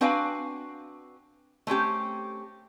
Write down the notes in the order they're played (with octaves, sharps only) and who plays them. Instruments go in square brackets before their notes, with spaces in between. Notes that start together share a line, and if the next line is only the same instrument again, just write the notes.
[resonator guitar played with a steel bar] C4 D4 F#4 B4 F5 G#5
A3 C4 C#4 G4